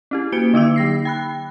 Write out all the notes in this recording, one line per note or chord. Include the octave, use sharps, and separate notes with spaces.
C#4 E4 G4
A#3 F#4 C#7 D7 G7
D3 D#4 D6 E6
F#3 A#6 C7
G5 B5 F#6